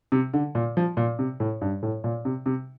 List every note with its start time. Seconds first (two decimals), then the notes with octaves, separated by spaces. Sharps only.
0.12 C3
0.34 D3
0.55 A#2
0.77 F3
0.97 A#2
1.19 C3
1.40 A2
1.61 G2
1.83 A2
2.04 A#2
2.25 C3
2.46 C3